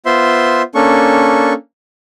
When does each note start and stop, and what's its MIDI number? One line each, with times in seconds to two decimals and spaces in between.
0.06 0.62 59
0.06 0.62 65
0.06 0.62 72
0.06 0.62 76
0.06 0.62 84
0.75 1.53 58
0.75 1.53 61
0.75 1.53 62
0.75 1.53 69
0.75 1.53 85